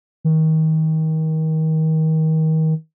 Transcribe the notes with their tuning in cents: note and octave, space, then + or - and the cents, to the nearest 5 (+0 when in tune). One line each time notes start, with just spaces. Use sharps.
D#3 +30